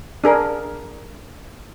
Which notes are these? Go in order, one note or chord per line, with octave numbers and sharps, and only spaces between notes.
D4 G#4 A#4